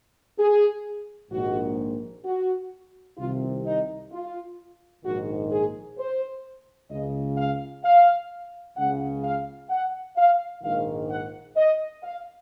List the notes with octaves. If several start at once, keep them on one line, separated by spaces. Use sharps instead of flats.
G#4
A#1 G#2 D#3 F#4
F#4
C2 C3 D#3 F4
D#4
F4
A#1 G#2 D#3 F#4
G#4
C5
C#2 C#3 D#5
F5
F5
C#2 C#3 F#5
F5
F#5
F5
A#1 G#2 D#3 F5
F#5
D#5
F5